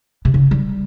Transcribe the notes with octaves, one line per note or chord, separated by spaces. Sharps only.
C3
C#3
G3